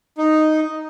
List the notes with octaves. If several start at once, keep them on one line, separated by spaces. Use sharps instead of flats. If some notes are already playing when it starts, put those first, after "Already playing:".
D#4